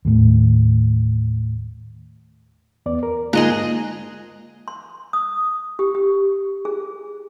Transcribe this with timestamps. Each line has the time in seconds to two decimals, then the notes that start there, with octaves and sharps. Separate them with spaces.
0.05 D#2 A2
2.86 E2 B3 D5
3.03 A#4
3.33 G#2 D3 A#3 F4 G#4 D#5 A#5 F#6
4.68 C6
5.13 D#6
5.79 G4
5.95 G4
6.65 G#4